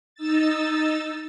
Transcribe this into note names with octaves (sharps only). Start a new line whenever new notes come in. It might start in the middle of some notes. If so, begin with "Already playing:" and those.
D#4 E6 A6